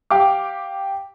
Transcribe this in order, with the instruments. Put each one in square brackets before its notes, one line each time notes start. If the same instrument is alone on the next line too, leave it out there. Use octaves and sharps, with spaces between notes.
[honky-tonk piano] G4 F5 D6